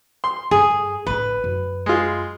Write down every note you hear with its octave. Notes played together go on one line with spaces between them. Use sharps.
C6
G2 G#4
A1 D4 B4
F#2
G#3 F4